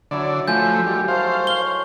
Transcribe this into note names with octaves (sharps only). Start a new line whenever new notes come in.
D3 F#3 E4 D5 E5
F3 A3 G#5 G6
D#3 G3
E4 A4 C5 F5 C#6
C#5 G7